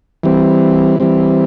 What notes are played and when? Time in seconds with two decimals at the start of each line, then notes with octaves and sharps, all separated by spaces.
0.23 E3 G3 C4
1.00 E3 G3 C4